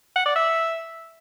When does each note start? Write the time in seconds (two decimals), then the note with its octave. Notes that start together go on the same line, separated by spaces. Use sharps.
0.16 F#5
0.26 D5
0.36 E5